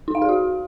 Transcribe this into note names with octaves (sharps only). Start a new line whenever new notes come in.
D#4
F5
G#4
F#4